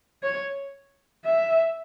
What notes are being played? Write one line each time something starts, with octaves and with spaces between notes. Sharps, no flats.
C#5
E5